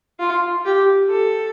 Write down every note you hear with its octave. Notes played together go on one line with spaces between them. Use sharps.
F4
G4
A4